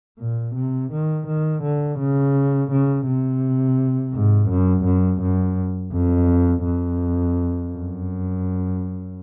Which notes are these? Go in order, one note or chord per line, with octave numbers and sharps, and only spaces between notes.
A#2
C3
D#3
D#3
D3
C#3
C#3
C3
G#2
F#2
F#2
F#2
F2
F2
F#2